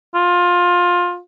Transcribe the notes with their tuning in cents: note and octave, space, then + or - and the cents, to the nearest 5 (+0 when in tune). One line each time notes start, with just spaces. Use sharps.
F4 +20